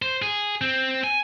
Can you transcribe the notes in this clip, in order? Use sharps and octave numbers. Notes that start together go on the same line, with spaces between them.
C5
G#4
C4
G#5